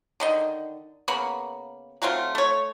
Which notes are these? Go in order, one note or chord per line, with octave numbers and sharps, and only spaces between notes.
D3 D#3 D#5
C#3 A#3 B3 B5
F#3 A3 C4 F4
A3 C#5